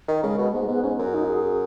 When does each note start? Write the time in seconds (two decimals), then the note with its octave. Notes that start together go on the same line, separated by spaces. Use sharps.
0.08 D#3
0.23 C#3 G#3
0.38 B2
0.53 G#2 B3
0.63 G#3
0.68 G#2 B3
0.83 G#2 C#4
0.99 F#2 F#4
1.14 D#4
1.24 F#4
1.29 G#4
1.44 G#4